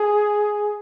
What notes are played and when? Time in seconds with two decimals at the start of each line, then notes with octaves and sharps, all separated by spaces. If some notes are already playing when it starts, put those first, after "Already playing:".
Already playing: G#4